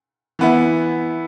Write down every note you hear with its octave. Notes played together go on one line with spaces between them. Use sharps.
E3 B3 E4